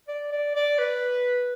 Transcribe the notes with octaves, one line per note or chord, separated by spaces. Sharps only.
D5
D5
D5
B4